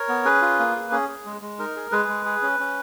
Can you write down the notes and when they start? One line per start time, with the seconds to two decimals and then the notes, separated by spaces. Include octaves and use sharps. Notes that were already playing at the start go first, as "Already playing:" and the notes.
Already playing: A#4 C#5
0.09 B3
0.25 C#4 G#4 B4
0.42 F4
0.59 A#3
0.75 G#4
0.92 C#4 G#4
1.09 G#4
1.26 G#3
1.42 G#3
1.59 D#4 A#4
1.76 G#4
1.92 G#3 G#4 B4
2.08 G#3
2.26 G#4
2.42 C#4
2.60 C#4